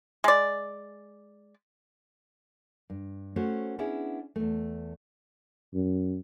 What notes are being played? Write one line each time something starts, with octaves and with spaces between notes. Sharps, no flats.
G#3 D5
G2
A3 C#4 F#4 C5 C#5
B3 C#4 D4 E4 G#4
E2 A3
F#2